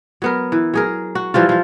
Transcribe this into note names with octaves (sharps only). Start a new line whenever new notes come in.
F#3 B3 A#4
E3
F#3 G#4 A#4
F#4
E3 F3 G3 F4
F3 F4